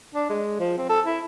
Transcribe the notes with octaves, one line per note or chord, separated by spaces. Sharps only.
D4
G#3
F3
C4
A4
E4